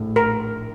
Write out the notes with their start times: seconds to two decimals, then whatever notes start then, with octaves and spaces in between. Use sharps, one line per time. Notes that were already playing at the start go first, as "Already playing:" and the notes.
Already playing: A#1 A2 A3
0.16 A#4